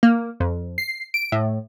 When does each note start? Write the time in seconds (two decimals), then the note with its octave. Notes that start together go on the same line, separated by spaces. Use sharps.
0.03 A#3
0.40 F2
0.78 C7
1.14 D7
1.32 A2